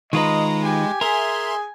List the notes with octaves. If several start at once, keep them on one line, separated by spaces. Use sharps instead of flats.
D#3 G#3 F4 B4 D#5 A#5
G4 G#5
G#4 A#4 E5 C6